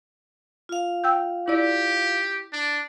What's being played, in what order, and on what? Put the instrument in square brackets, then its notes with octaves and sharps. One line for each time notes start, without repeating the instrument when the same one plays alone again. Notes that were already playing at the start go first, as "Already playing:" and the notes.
[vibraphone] F4 F5
[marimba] G5 E6 G6
[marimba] E4 D5 [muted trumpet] G4
[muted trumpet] D4